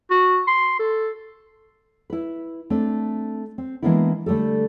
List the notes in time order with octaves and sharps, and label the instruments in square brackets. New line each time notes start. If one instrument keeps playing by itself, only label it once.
[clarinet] F#4
C6
A4
[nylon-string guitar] E4 B4
A3 C4 D4
C4
E3 G#3 A#3 B3 D4 E4
D3 G3 A3 G4 A4